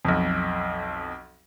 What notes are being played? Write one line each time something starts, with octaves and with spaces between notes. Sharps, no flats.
B1 F2